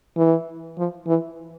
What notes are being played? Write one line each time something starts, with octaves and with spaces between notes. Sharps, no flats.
E3
F3
E3